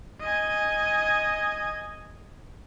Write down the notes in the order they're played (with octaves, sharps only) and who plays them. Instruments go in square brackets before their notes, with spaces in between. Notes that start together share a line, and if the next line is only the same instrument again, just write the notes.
[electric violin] D#5 G#5